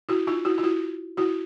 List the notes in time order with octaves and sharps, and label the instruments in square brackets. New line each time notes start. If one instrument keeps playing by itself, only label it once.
[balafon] E4 F#4
D#4 F4
E4 F#4
F4
E4 F#4
E4 F#4